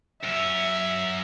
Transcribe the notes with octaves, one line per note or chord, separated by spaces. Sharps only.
F#2 C#4 E5